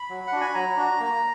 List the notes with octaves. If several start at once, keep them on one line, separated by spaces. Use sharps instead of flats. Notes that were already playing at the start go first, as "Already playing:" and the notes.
Already playing: B5
F#3
F#5
D4 F#4
G#5
F#3 A#5
D4 F#4
A#3